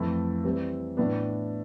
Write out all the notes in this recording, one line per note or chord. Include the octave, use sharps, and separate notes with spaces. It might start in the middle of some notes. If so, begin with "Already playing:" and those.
Already playing: F2 E3 A3 E4
E3 G3 C4
A2 E3 B3 D4